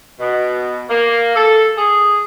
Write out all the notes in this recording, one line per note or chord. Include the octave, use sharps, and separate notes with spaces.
B2
A#3
A4
G#4